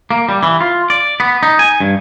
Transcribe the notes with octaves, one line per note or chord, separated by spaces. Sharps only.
A#3
G3
E3
F4
D5
B3
D#4
G#5
G2